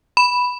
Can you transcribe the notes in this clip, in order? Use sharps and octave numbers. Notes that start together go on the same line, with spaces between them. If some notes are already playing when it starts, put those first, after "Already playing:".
B5